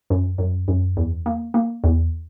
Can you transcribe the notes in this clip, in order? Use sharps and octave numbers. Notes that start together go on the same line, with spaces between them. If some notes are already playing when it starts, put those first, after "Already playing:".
F#2
F#2
F#2
E2
A#3
A#3
E2